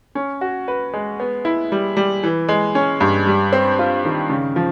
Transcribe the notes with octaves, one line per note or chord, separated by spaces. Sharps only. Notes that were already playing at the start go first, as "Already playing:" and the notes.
C#4
F#4
B4
G#3
B3
E4
G3
G3
E3
G#3
C#4
G2
G3
C4
F4
D#3
C#3
F3